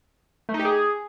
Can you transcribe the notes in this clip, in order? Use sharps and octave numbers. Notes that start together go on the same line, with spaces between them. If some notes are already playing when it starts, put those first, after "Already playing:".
A3
D#4
G4
G#4